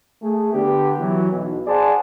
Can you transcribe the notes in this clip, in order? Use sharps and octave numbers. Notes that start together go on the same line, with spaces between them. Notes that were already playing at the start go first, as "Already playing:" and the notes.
A3 G#4
D3 B3 G4
E3 F#3
B1
G#4 C5 D5 F#5 G#5 A5